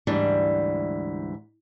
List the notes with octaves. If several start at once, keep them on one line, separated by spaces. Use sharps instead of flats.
D2 G#2 E3 G3 D4